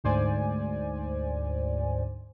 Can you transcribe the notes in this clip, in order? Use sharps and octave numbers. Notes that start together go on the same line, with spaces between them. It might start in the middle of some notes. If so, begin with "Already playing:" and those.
D2 G#2 C5 D5 G#5